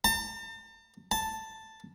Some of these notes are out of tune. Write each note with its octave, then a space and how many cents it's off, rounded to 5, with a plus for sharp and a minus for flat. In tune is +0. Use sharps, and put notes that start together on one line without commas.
A5 +40
A5 +5